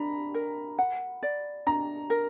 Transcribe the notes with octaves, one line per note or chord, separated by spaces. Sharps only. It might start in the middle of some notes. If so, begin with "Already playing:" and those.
Already playing: D4 A#5 B5
A#4
F#5
D5
D4 A#5
A#4